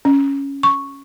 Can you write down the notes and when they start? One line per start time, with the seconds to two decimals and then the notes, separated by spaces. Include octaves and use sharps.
0.05 C#4
0.63 C#6